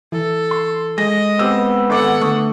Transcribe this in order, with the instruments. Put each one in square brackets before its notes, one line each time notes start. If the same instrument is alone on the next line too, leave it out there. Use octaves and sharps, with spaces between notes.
[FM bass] E3 [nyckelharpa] A4
[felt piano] C6
[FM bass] G#3 [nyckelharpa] D#5 [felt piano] A#6
[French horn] B3 [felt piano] C4 G4 E6
[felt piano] G#1 D6 [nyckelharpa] A4 F#5
[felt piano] D3 C#6 D#6 [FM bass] A3